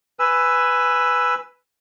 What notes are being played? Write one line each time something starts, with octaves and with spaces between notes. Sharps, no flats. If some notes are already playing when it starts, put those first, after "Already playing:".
B4 G#5 E6